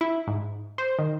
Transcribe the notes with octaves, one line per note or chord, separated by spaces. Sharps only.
E4
G#2
C5
D#3